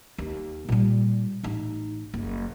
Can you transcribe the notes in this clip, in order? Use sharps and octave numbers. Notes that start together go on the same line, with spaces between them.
D#2
A#2 G3
A1 D#4
F#1